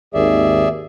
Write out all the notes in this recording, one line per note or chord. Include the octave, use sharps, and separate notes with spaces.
G#1 D#2 G#4 D5 E5